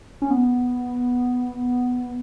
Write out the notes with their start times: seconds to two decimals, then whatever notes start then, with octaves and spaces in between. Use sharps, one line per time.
0.22 C#4
0.30 B3